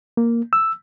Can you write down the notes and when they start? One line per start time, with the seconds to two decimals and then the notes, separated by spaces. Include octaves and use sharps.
0.17 A#3
0.53 E6